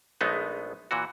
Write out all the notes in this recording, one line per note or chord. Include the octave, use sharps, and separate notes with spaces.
A#1 G#3 A3 B3 D#4
A#2 E3 F#4